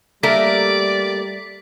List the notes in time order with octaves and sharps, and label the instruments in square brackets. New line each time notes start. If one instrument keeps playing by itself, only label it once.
[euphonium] G3 [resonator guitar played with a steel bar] A3 A#3 A#4 [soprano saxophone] D5 [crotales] B6